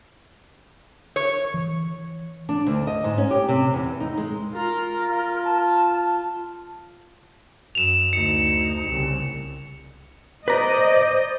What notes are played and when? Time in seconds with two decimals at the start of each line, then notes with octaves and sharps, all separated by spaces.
1.16 C#5
1.54 E3
2.49 D4
2.67 D2
2.87 D#5
3.04 G#2
3.18 C#4
3.31 G4
3.49 C3
3.74 E2
4.00 D#4
4.18 G#3
4.54 F4 A#4 A#5
5.08 F4
5.44 A5
7.75 F#2 E7 F7
8.13 D2 D#4 C#7
8.86 C2 C#3
10.48 B4 C5 D5 D#5 A#5